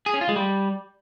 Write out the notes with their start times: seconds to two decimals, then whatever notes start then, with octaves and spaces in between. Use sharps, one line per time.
0.06 G#4
0.14 C#4
0.21 F4
0.29 G#3
0.36 G3